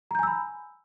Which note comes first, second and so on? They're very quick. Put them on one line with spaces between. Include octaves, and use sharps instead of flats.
A#5 G6 G#5 E6 B5